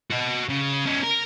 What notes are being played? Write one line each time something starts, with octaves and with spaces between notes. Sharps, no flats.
F#4 D#5
C#3
C#4 D#4
A#4